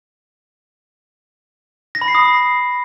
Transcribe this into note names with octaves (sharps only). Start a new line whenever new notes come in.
A#6
B5
C7
D#6